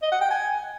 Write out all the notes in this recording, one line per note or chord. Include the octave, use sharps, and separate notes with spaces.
D#5
F#5
G5
G#5